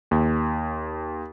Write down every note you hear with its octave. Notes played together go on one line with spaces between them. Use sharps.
D#2